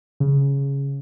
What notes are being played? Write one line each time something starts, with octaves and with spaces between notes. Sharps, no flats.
C#3